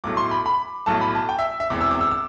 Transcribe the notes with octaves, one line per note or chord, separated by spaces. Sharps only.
B1 A2 F#3 A3 D6
C6
B5
B5
B1 A2 F#3 A3 A5
B5
A5
G5
E5
E5
E1 E2 C3 D6
E6
D6
E6
E6